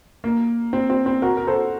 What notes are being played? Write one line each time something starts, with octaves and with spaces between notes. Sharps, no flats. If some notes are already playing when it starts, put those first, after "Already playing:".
A#3
C4
C4
C4
F#4 A#4
A#4
A4 C5